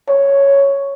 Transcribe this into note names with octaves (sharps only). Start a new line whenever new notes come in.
C#5